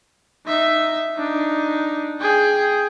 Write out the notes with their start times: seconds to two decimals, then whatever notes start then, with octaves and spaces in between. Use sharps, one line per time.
0.47 D#4 E5
1.17 D4 D#4
2.21 G#4 G5